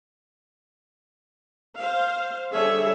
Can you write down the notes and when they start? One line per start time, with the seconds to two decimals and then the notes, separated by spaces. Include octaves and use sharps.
1.79 C5 F5
2.52 D3 G3 G#4 C#5 E5